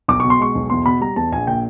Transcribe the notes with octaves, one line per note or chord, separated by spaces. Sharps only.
B1 D6
B2 C#6
C6
G#3 C#6
B1
E2 C6
B2 B5
G3 A#5
E2 A5
A#1 G#5
A#2 G5